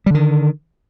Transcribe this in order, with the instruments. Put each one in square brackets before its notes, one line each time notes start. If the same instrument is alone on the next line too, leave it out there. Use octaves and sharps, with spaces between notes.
[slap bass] G3
D3
D#3